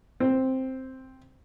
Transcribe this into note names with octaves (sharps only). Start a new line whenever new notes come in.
C4